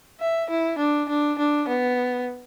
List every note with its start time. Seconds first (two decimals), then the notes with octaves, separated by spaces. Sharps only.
0.20 E5
0.50 E4
0.79 D4
1.09 D4
1.39 D4
1.68 B3